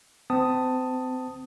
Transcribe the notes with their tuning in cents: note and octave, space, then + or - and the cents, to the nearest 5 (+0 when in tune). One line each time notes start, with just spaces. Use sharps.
C4 -35 A5 +10 D#6 +0